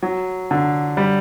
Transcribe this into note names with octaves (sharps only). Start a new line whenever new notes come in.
F#3
D3
G3